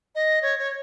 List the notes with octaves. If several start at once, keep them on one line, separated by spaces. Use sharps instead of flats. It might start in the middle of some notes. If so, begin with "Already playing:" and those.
D#5
C#5
C#5